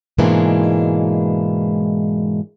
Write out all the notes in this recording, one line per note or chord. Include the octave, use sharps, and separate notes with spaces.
G#2 B2 E3 G#3 A#3 D4